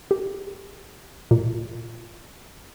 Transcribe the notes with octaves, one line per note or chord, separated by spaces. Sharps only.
G4
A#2